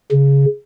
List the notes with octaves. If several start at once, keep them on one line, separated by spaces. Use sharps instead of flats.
C#3